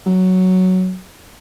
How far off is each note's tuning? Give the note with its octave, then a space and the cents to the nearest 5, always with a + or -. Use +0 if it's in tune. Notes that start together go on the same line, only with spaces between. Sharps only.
F#3 +5